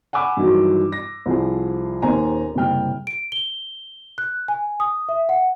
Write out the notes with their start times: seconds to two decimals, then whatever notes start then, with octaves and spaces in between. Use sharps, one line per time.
0.13 F#5 G#5 B5 D6 E6
0.37 G2 D#3 E3 F#3
0.92 A#6
1.26 C2 F3 G#4
2.02 D#1 D#2 C5 G#5 A#5
2.55 F#1 C3 G3 G5 F6
3.07 D7
3.32 G7
4.18 F#6
4.48 G#5
4.80 D#6
5.09 E5
5.29 F#5